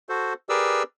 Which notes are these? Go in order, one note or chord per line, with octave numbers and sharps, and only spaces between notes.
F#4 A4 C5
G4 G#4 A#4 B4 D5 E6